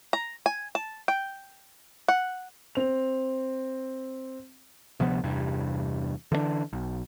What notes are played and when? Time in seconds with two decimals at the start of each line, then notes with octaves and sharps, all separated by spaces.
0.13 A#5
0.46 G#5
0.75 A5
1.08 G5
2.08 F#5
2.75 C4 F7
5.00 D2 C3 F3 B3
5.23 E2 G2 C3
6.32 D3 E3 A3 D4
6.73 B1